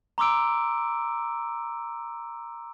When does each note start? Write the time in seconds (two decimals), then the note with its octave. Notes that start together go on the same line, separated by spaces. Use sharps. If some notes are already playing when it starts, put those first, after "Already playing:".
0.18 A#5 C6 D6 E6 D7